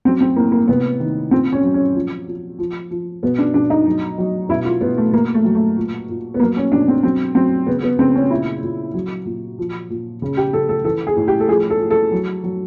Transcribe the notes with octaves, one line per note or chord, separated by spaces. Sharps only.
F#3 C4
C4
A2 A#3
A#3
C3 B3
D#3
A#2 C4
C#4
F#3
C#4
F3
F3
F3
F3
B2 B3
D4
B2 D4
D#4
F#3
F#3
B2 E4
F4
B2 B3
A3
B2 A#3
A3
F#3
A3
A#2
A#2
B3
F#3 A#3
C#4
B2 D4
C4
F#3 C4
F#3 C4
C#3 B3
B3
C#3 C4
C#4
A#2 E4
A#2
F#3
A#2
F3
A#2
C#3
G4
C#3 A4
A4
E3 A4
G#4
A2
G4
A4
F3 G#4
A4
F3
A4
F#3
F#3